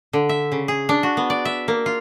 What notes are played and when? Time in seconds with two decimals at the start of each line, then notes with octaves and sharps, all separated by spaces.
0.13 D3
0.29 E5
0.52 C#3
0.68 G#4
0.89 D4
1.03 F#4
1.17 B3
1.30 D5
1.45 E5
1.68 A#3
1.86 F4